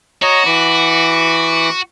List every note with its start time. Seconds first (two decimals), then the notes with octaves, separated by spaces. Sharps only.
0.22 F#4 C#5 D#5 A#5
0.46 E3 B5 D6